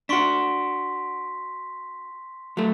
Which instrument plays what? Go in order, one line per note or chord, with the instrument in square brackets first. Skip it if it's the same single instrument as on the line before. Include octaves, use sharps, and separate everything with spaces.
[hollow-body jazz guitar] D4 F#4 [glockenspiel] C6 C#6 B6
[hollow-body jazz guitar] F#3 A3